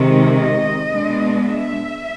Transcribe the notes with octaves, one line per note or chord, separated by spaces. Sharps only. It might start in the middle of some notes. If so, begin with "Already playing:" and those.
Already playing: C3 D#3 G#3
D#5
B2 G#3 B3 D4
E5